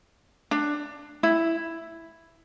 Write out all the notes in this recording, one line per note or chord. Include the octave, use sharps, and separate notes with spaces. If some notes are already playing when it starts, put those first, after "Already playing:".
D4
E4